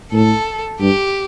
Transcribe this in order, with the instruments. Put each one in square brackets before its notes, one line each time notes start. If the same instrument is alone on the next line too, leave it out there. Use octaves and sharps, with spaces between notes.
[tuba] A2 [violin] A4
[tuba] G2 [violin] G4